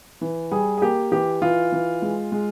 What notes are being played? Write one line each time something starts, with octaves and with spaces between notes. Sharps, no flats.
E3
G3 G#4
G#4
A#3 G4
E3 G4
E3 F4
E3
G#3
G#3